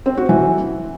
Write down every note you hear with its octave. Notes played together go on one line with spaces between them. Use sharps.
C4
F#4
E3